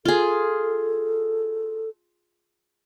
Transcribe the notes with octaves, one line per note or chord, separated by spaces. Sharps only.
F4 G#4 A4